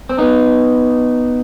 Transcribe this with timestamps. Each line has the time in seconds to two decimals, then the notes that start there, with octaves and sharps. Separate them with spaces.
0.09 C4
0.18 B3 D#4